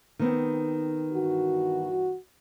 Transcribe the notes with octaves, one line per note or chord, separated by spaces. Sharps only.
D#3 B3 C4
G2 E3 F#4